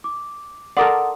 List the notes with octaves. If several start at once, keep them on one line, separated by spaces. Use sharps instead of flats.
D6
A4 A#4 D5 F#5 C6 D#6